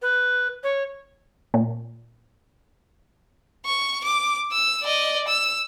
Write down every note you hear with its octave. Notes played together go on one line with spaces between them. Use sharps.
B4
C#5
A#2
C#6
D6
E6
D5 D#5
E6